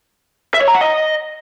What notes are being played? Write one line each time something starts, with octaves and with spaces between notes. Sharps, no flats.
E5
C#5
A#5
F#5
D#5